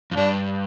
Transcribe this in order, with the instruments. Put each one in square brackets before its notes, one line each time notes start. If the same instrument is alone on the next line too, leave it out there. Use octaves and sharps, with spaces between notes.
[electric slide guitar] F2
[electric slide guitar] G2 [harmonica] D4